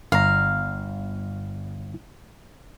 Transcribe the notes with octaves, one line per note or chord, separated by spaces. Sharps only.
G1 F5 A#5